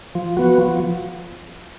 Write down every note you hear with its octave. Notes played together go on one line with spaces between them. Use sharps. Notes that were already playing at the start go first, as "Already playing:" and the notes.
F3
B3 F#4
F3